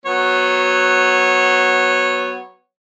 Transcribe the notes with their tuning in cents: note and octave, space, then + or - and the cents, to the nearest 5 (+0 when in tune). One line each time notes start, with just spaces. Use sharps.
F#3 +0 B3 +0 C#5 -15